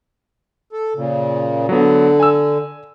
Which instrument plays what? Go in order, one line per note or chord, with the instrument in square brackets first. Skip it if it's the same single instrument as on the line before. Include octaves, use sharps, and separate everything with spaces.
[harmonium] A4
A#2 C#3
[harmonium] D3 [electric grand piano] F#3 B3
[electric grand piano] G#5 E6